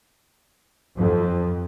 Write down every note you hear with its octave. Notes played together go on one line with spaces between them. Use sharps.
F2